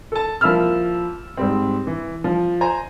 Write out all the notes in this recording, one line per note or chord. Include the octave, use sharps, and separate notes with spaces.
A4 A5
F3 A#3 E4 B5 E6 F6
G#2 G3 C4
E3
F3
C5 G#5 A#5